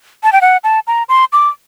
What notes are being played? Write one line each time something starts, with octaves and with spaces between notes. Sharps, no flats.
A5
G5
F#5
A5
A#5
C6
D6